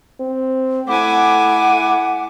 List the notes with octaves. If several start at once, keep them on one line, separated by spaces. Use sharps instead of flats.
C4
A3 E4 F#5 G#5 D6